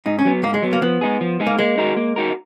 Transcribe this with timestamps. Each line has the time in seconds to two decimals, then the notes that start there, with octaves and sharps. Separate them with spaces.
0.06 G#2 D#4
0.19 C#4
0.25 F#3 B3
0.43 G#2 A#3
0.54 G#3
0.62 F#3 B3
0.73 A#3
0.82 F3 B3
1.01 G#3 D#4 G#4
1.21 F3
1.40 G#3 D#4 G#4
1.47 A#3
1.58 G#3 A#3
1.78 D#4 F#4 A#4
1.96 A#3
2.16 D#4 F#4 A#4